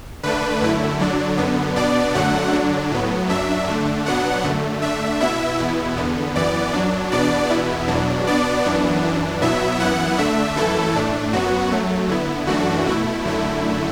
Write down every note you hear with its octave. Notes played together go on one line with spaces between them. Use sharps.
D3 A3 D4 B4
F#2 D3 A3 E4
D3 F#3 D4
F#2 D3 B3
B2 B3 D4 D5
F#2 D3 F#3 A3 D4 F#5
D3 F#3 D4
A2 F#3 B3
F#2 F#3 D4 E5
D3 A3 D4
B2 F#3 B3 D4 F#5
F#2 D3 A3
D3 A3 D4 E5
B2 B3 E4 E5
E2 B2 B3 E4
E2 D3 B3
F#2 E3 B3 D5
F#2 F#3 D4
E2 B2 B3 D4 D5
E2 B2 B3 E4
E2 B2 F#3 D4
B2 B3 D4 D5
F#2 E3 B3 D4
F#2 E3 D4
B2 F#3 B3 E4 E5
F#2 E3 B3 E4 F#5
D3 A3 D4 E5
F#2 E3 A3 E4 A4
A2 A3 D4
F#2 F#3 B3 F#4
F#2 F#3 A3
D3 B3 E4
F#2 E3 A3 D4 F#4
B2 A3 E4
F#2 D3 A3 E4